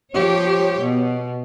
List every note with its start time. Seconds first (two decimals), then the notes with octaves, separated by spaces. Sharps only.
0.15 F3 G4 C#5
0.81 B2